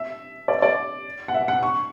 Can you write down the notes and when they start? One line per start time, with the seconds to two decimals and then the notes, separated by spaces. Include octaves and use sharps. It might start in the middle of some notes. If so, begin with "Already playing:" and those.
Already playing: E5
0.48 D5
0.62 D5
1.28 F#5
1.34 E5
1.48 F#5
1.63 C#6